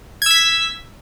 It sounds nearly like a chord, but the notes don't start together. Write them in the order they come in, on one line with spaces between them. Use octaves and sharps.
G#6 E6 B6